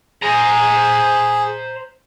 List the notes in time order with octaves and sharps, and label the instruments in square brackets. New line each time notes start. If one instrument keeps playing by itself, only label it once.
[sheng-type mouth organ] G#4 [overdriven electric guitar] C5 A#5